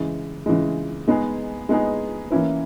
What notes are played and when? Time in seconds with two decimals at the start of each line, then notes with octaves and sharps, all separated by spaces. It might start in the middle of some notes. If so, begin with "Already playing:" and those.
Already playing: C#3 E3 G#3
0.46 C#3 E3 G#3
1.07 G#3 B3 D#4 G#4
1.69 G#3 B3 D#4 G#4
2.31 E3 A#3 C#4 E4 B4